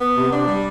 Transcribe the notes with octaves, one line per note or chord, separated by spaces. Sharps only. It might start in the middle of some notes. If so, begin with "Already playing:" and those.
B3
C3
D4
G3